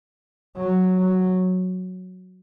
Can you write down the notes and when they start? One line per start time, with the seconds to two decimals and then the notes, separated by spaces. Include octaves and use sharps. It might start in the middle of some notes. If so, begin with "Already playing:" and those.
0.57 F#3
0.98 F#3